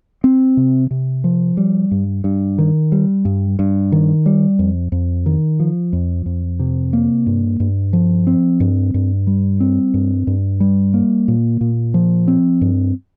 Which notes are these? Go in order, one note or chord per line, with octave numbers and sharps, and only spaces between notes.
C4
C3
C3
F3
G3
G2
G2
D#3
G3
G2
G2
D#3
G3
F2
F2
D#3
F3
F2
F2
C3
A#3
G2
G2
F3
C4
G2
G2
G3
C4
G2
G2
G3
A#3
A#2
A#2
F3
C4
G2